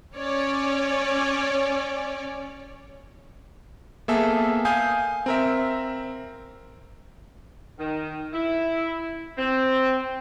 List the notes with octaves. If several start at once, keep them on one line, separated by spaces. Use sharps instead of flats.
C#4 C#5 D5
A#3 B3 G#4 A4 E5
F5 G#5 D#6 G6
C4 A#4 E5
D#3
E4
C4